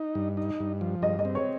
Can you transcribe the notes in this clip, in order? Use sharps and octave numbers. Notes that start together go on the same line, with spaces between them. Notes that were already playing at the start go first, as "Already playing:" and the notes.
Already playing: D#4
G2
D#4
G2
F3
G2 D#5
D#5
C4
C#5